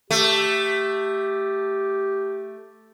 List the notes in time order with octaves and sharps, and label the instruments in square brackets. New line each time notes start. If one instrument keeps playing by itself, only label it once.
[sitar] A3 [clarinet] G4